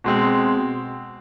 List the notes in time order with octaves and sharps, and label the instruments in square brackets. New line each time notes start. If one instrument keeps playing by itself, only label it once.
[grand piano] B2 G#3 C4